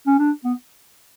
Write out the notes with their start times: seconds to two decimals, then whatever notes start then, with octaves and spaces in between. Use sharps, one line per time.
0.06 C#4
0.19 D4
0.44 B3